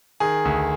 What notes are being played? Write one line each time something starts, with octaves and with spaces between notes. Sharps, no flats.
D#3 G#4
D2